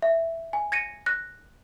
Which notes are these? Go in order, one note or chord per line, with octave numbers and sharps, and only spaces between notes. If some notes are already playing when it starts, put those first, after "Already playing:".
E5
G#5
G#6 A#6 C#7 D#7
F#6 A#6